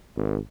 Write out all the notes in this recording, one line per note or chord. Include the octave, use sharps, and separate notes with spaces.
G#1